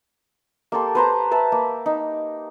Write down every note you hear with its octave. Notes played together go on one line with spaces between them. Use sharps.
A#3 G4 A4 C6
B4 C5 A#5
B4 E5 A5
A#3
D#4